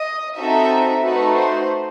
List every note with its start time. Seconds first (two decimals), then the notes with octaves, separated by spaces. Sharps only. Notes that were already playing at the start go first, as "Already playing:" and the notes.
Already playing: D#5
0.35 C4 D#4 F#4 A4 E5
1.01 A3 D#4 F#4 B4
1.34 C5